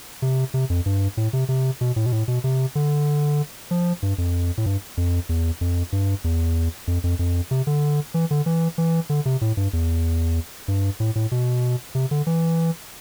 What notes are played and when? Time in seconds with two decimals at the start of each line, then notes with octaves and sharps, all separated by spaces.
0.22 C3
0.54 C3
0.70 F2
0.86 G2
1.17 A2
1.33 C3
1.49 C3
1.81 B2
1.96 A2
2.06 B2
2.12 A2
2.28 B2
2.44 C3
2.75 D3
3.71 F3
4.03 G2
4.18 F2
4.58 A2
4.66 G2
4.97 F2
5.29 E2
5.61 F2
5.92 G2
6.24 E2
6.87 F2
7.04 F2
7.19 F2
7.51 C3
7.67 D3
8.14 E3
8.31 D3
8.46 E3
8.78 E3
9.10 D3
9.26 C3
9.41 A2
9.57 G2
9.73 E2
10.68 G2
11.00 A2
11.15 A2
11.32 B2
11.95 C3
12.11 D3
12.27 E3